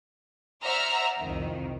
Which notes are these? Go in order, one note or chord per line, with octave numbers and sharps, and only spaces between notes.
C5 D5 E5 F#5 A#5 F6
C2 F2 D#3